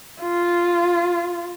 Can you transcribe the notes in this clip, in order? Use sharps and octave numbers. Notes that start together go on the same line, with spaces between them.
F4